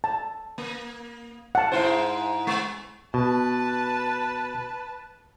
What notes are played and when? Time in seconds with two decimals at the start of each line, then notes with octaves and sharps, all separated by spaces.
0.04 A5
0.58 A#3
1.55 F#5 A5
1.72 G#2 E4 C5
2.47 G#3
3.14 B2 B4 A5